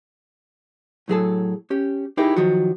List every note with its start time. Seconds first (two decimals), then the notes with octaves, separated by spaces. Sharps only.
1.08 A2 F#3 G#4 A4
1.70 C#4 G4
2.17 D#4 E4 G4 G#4 A#4
2.36 D#3 F3 F#3 F#4